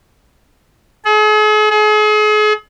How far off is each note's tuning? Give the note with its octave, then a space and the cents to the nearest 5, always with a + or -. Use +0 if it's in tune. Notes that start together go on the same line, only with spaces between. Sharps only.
G#4 +45
G#4 +40